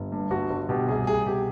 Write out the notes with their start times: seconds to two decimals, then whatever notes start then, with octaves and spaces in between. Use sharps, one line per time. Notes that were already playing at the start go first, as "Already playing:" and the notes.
Already playing: G1
0.12 G2
0.30 G1 F#4
0.50 G1
0.69 B2 G4
0.88 C2 G#4
1.07 C2 G#4
1.26 B2 G4